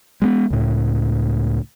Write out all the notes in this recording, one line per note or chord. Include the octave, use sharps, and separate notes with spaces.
G#3 A3 B3
C#2 A2